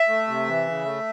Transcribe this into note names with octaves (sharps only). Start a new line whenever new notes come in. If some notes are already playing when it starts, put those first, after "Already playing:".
Already playing: E5
A3
C3
E3
C#3
A3